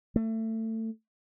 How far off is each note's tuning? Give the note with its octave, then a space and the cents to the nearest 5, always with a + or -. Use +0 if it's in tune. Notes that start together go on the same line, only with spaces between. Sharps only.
A3 +25